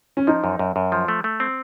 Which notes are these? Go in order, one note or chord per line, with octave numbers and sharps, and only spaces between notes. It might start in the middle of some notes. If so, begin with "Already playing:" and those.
C#4
F3 D#4
F#2
F#2
F#2
F3
A3
A3
C4